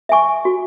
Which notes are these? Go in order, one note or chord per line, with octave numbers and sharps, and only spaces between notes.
E5 G#5 C#6
F#4